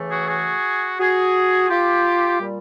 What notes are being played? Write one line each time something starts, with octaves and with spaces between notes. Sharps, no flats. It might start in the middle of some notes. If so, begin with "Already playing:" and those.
Already playing: C#3 E3 A3
F#4 G#4
F#4 G#4
F#4 G#4
F4 G4
A#2 G3